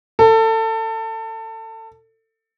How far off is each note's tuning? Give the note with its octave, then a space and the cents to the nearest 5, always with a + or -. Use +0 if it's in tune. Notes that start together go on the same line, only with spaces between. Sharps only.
A4 +25